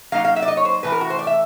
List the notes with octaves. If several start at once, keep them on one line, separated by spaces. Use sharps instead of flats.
F#3 A#3 D#4 F5
F5
E5
D5
D#5
C#5
C5
A2 E3 A3 B4
A#4
F#4
C5
D5
E5